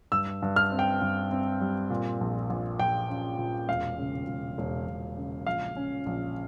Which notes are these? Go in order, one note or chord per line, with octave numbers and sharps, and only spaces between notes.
G2 E6
G2
F6
C4
G5
G2
C4
G3
A#2
A#1
A#1
A#1 G5
C#4
A#2
E1 F5
C#3
E1
E1
E1
C#3
A#1 F5
C#4
A#1